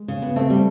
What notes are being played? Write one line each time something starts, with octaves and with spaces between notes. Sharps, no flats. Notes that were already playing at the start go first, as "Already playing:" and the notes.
Already playing: G#3
C#3
B3
A3 C4
G3